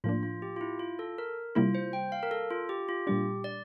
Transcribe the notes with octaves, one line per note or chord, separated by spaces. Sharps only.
A2 F3 A#3 D4 F4
F4
G4
F4
E4
F4
A4
A#4
C3 G3 A#3 E4 F4
C5
G5
F5
A#4
A4
F4
G4
F4
A#2 G3 D4 G4
D5